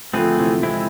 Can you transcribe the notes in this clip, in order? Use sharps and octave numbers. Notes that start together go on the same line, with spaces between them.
D3 F3 A3 C4 G#4 B4
C3 E3
G#3 C4 E4